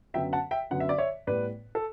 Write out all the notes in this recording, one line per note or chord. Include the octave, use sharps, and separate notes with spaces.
F#2 D3 F#3 B3 E5 G5
F#5 A5
E5 G5
F#2 D3 F#3 B3 F#5
E5
D5
C#5 E5
A2 G3 B3 B4 D5
A4